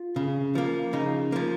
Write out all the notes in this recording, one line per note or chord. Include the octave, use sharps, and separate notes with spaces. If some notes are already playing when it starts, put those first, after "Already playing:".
Already playing: F4
C#3
F3 A#3
C#3 D#4
F3 A#3